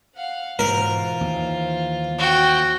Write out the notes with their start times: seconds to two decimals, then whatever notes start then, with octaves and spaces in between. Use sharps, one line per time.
0.14 F5 F#5
0.59 G#2 B2 E3 F4 A#4 C5
1.21 D#2
2.19 F#4 G5